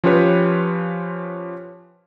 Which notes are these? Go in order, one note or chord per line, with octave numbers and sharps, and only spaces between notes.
F3 C#4 F4 G4 B4 C#5